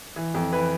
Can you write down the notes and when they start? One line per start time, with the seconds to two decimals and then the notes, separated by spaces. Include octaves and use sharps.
0.16 E3
0.34 F2
0.52 E3 B4